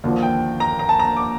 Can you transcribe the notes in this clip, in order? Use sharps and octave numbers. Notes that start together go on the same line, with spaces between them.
D#2 D3 F3
G5
A#5
A#5
A5
A#5
D6